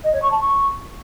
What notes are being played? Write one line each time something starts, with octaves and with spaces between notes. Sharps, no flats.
D#5
C#5
C#6
A5
C#6